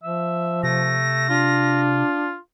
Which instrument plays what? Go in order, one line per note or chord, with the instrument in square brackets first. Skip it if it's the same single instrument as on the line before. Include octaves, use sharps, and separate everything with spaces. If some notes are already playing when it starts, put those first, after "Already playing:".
[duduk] F3 [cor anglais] E5
[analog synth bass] C3 [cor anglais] A3 [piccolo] A#6
[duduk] D4 [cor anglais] F4